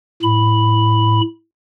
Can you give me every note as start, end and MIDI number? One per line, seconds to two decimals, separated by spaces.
0.23 1.21 45
0.23 1.21 83